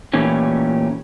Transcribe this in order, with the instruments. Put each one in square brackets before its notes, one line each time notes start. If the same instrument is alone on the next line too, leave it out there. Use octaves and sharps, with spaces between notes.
[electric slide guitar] A#2 E3 A3 C#4 G4